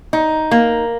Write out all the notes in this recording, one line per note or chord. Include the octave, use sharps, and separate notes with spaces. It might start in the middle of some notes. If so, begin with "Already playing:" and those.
D#4
A#3